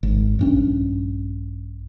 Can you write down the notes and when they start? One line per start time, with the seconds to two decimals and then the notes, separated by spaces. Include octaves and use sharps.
0.03 G#1
0.39 A#1 G2 C#4